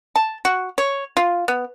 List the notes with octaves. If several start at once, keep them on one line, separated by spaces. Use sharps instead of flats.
A5
F#4
C#5
F4
B3